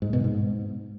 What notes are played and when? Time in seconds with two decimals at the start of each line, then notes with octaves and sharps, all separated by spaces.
0.02 G#2
0.13 B2
0.24 G#2